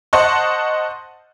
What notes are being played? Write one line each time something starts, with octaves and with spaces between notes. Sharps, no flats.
C5 D#5 F#5 A5 C6 C#6